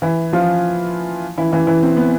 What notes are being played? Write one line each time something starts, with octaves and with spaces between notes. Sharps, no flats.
E3 E4
F3 F4
E3 E4
E3 E4
E3 E4
C4
B3